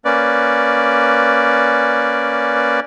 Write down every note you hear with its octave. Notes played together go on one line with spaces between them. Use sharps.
A#3 C#4 B4 D5